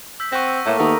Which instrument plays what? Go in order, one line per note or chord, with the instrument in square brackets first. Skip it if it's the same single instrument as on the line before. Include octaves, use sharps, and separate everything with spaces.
[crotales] E6 G6 B6
[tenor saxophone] C4 [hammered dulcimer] F#5 [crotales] C#6 A#6
[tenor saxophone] A2 [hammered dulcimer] A3 A#3
[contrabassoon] D#2 [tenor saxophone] B3 [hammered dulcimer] A#4 [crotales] D#6